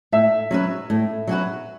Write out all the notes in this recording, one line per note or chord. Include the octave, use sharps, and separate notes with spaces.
A2 E5
F#3 C#4 F#4 B4
A2
F#3 C#4 F#4 B4